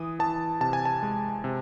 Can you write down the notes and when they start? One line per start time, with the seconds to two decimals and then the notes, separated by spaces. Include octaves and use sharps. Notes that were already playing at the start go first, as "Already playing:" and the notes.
Already playing: E3 D#6
0.19 E3 A5
0.60 C3 A5
0.73 G#5
0.85 A5
1.03 G#3
1.44 C3